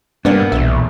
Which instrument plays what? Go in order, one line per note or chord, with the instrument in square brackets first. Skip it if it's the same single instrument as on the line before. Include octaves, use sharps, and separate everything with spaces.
[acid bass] G2 [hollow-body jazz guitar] A#3 B3 D4
[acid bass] B1 [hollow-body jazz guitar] E2 A#2 E5